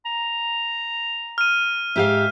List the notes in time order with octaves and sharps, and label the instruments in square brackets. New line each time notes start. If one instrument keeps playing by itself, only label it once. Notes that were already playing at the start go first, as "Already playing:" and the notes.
[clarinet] A#5
[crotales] F6 D#7
[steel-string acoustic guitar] G#2 G4 F5 [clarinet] E5